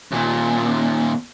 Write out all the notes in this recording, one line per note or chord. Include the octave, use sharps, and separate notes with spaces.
D#2 A#2